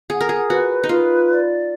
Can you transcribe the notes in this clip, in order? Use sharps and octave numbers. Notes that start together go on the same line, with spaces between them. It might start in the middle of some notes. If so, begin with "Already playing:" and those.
G#4 F#5
A#4
G#4
F#4 B4
D#4
F4 B4
D5